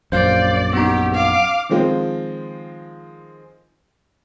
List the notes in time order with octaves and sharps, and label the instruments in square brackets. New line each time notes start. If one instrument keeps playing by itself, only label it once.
[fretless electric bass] A#1 F#2 [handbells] C5 F5 G6 [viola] D5
[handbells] B3 D#4 [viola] G4
[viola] F5 D6
[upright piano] D#3 F3 G#3 C4 F4